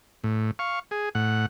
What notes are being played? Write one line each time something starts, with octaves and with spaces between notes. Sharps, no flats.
A2
F5 C#6
G#4
A2 F#5